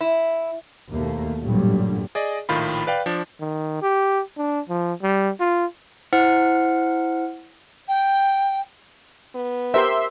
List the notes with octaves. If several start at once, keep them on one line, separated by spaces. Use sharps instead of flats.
E4
D#2 B2 A3 A#3
A1 G2 A#2 D3 F#3 G3
G#4 D5 D#5
A#1 A2 D#3 F4 B5
B4 D5 F5 G5
F3 D4
D#3
G4
D4
F3
G3
F4
E4 C5 F#5 F6 C#7
G5
B3
G4 A#4 C5 E5 C6